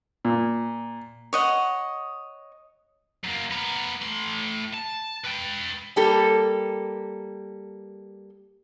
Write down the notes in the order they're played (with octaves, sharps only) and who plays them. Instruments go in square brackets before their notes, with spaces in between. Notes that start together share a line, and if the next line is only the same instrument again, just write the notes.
[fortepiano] A#2
[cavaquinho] C#5 D#5 F#5
[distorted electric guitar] F#2 A#3
B3 A#4
A2 C6
A5
B4 G5
[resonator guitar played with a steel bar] G3 A#3 G4 A4